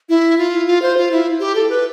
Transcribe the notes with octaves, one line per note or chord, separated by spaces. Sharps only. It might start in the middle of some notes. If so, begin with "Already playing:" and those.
E4
F4
F4
C5
F4
E4
G4
A4
B4